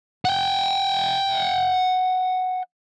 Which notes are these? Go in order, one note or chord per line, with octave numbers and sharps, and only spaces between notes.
F#5 G5